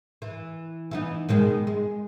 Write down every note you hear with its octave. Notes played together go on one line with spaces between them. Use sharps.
E3
E3 B3 D#4
B2 D#3 G#3
G#3